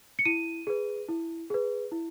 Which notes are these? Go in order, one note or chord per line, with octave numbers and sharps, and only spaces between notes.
C#7
E4 D#7
G#4 B4
E4
G#4 B4
E4